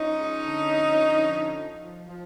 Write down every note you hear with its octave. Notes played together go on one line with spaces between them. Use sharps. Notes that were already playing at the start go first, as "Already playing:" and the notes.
Already playing: F3 C#4 D#4
G#3
D3
F2
D3
F3
F3
F3
F3